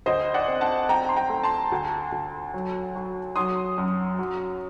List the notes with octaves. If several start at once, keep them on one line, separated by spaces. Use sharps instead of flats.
D2 C5 D#5
D5 F#5
C4
F#5 A5
C4 G5 A#5
C6
G5 A#5
A3
A5 C6
D2
D2
F#3
F#3
F#3 C6 D#6
F#2
F#3